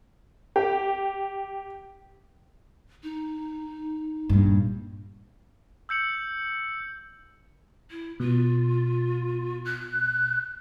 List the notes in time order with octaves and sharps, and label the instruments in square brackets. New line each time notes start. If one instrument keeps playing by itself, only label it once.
[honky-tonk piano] G4
[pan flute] D#4
[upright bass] G2 A#2
[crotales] E6 G6 C#7 F#7
[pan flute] E4
[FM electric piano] B2 [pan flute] F4
[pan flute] F#6